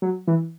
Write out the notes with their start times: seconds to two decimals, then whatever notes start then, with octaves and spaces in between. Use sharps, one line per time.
0.02 F#3
0.27 E3